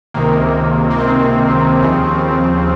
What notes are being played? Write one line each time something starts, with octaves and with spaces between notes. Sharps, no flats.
C#2 C3 D#3 A#3
A#3
C4
D#2 C#3 F3